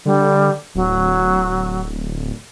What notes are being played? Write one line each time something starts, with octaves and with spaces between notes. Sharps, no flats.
D3 G3
D1 F#3